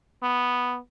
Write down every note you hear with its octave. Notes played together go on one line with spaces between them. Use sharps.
B3